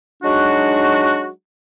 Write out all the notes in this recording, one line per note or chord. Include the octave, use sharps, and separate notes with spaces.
F#3 G#3 D4 D#4 F#4